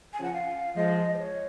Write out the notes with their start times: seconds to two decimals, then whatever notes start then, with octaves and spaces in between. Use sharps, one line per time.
0.13 G#5
0.19 C#3 F3
0.24 F#5
0.34 F5
0.76 F3 G#3 D#5
1.14 C5
1.19 C#5